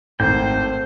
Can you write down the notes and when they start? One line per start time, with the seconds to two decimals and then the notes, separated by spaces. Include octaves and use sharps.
0.20 G#1 A3 C4 A4 C5 G5